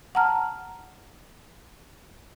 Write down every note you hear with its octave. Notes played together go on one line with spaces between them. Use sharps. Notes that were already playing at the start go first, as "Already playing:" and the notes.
F#5 A5 A#5 F6